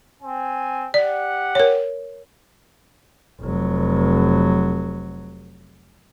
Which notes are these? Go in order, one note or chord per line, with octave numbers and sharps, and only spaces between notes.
C4 G#5
G4 D5 F#5
A#4 C#5
F1 F#3